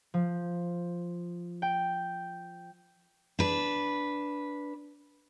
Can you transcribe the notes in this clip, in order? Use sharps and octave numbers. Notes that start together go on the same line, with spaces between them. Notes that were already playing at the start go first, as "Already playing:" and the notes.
F3
G5
D4 B4